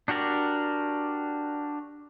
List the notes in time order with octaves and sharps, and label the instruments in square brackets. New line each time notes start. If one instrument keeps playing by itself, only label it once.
[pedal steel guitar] D4 F#4 G4 A#4 D5